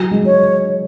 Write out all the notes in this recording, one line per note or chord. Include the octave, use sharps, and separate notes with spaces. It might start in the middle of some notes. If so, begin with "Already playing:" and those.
Already playing: F#3
G#3
C#5